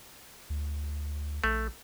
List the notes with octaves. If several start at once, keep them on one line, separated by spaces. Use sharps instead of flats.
D2
A#1 A3